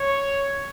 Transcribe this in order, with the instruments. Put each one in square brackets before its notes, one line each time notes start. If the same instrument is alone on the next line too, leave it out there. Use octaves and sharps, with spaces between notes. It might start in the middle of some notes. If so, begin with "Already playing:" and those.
Already playing: [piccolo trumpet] C#5